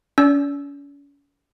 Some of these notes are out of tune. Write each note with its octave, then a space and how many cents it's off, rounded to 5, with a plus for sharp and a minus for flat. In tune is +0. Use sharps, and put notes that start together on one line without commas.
C#4 +40 D5 -30 E6 +0